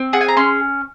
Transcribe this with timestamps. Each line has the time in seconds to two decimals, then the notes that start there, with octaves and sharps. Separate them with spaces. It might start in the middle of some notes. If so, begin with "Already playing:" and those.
Already playing: C4
0.13 G#4 F#5
0.21 G#5
0.28 A#5
0.37 C#4 C6